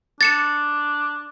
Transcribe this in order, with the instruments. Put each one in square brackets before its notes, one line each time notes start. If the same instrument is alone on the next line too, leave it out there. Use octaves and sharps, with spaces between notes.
[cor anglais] D4 [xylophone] A6 C#7 E7